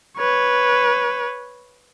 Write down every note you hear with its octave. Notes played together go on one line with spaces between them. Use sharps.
B4 C#5